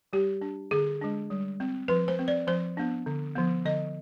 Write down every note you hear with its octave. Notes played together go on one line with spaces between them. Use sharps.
G3 G4
D4
D3 G#4
G#3 D4
G3
C4
F3 B4
C5
C4
D5
F3 C5
B3 D4
D3
F3 B3
D3 D#5